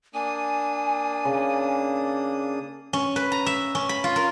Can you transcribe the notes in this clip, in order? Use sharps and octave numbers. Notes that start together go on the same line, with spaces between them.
A#3 D4 G#5 D#6
C#3
C#4
B4
A#5
E5
C#4
B5
F4
A#4